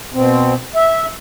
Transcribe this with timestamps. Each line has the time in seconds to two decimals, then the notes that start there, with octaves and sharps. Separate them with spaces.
0.14 B2 C4
0.76 E5